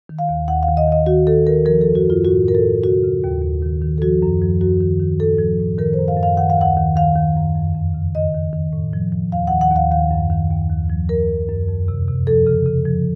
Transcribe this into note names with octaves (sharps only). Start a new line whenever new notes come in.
D#3
F5
D#2
D#2 F#5
F5
D#3
D#5
D#3 D#5
D#3 F#4
D#3 A4
D#3 A#4
F3 A#4
F#2 A4
F#4
F#2 F4
A2 F#4
A2 A#4
A4
A2
C#3 F#4
C#3
D#2
D#2
D#3
D#3
A4
F3 F#4
F#2
F3
F#2 F#4
D#3
D#3
A2 A4
F3
A2
D#3 A#4
F#2 C5
F5
F#2
F5
D#3 F#5
F5
D#2 F#5
D#3
D#3 F5
D#3
F#2
F2
F2
C#3
D#3 D#5
D#3
D#3
A2
F3
F3
D#2 F5
D#3 F#5
F#5
D#2 F5
D#3 F5
F#2
D#3
D#2
D#2
F3
F#2 A#4
F3
F#2
F2
C3
C3
F3 A4
C#3
C#3
F3